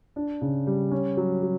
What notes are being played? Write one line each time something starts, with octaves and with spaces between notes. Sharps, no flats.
D4
C#3
G3
C#4
F#3
F#3